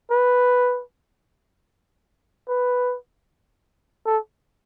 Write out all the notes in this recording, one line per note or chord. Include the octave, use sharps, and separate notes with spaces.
B4
B4
A4